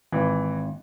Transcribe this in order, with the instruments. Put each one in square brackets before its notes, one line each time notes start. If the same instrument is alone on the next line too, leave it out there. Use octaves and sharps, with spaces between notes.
[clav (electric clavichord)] G#1 [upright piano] E3